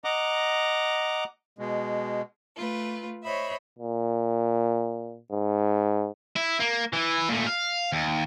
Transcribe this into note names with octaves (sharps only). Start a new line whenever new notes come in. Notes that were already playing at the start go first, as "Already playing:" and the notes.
D#5 F#5 A#5 D6
B2 G#3
A3 F4 B4
C5 C#5 D#5 E5 B5
A#2
G#2
E4
A#3
E3 E4
A#2 A3
F5
D#2